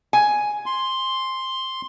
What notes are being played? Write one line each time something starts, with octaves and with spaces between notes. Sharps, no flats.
G#5
C6